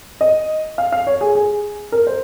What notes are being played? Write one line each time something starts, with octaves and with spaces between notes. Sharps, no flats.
D#5
F5
F5
C#5
G#4
G#4
A#4
C5